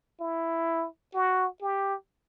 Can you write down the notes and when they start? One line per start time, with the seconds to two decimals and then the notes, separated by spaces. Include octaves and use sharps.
0.20 E4
1.14 F#4
1.61 G4